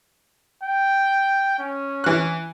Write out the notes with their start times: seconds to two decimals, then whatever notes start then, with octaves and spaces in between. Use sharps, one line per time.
0.63 G5
1.59 C#4
2.04 E3 F#6